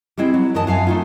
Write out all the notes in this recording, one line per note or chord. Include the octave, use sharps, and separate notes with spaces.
G3 G#3 C4 E4
F#3
F#2 E3 D#5 A5
F#2 F5 G#5
A3 D#4 F4